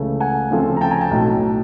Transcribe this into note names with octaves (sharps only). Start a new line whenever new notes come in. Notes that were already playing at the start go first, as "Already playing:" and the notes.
Already playing: C#2 C#3 E3 A3
F#5 G#5
D2 C#3 F3 A3 C4
A#5
G5 A5
G#5 A#5
G5 A5
B1 A2 F#3